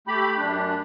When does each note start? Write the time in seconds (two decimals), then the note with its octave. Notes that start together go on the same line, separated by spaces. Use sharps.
0.07 A3 G4 B5
0.37 F#2 D4